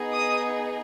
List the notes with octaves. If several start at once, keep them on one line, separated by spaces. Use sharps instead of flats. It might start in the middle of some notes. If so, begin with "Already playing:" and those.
Already playing: B3 D#4 G#4
D#6